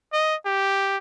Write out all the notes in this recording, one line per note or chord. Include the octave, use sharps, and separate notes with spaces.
D#5
G4